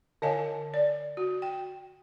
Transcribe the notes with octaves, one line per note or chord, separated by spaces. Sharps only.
D3 C#5 D#5 F5 G#5
D5
F#4
G5